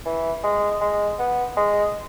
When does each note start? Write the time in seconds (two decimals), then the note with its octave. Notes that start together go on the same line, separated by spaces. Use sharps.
0.05 E3
0.43 G#3
0.81 G#3
1.19 B3
1.57 G#3